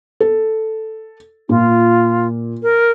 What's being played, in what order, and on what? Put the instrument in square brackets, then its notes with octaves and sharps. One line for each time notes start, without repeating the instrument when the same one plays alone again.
[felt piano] A4
[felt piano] A#2 [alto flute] F4
[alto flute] A#4